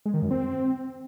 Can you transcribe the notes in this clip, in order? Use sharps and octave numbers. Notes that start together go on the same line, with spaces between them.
G#3
D#3
F#2
C4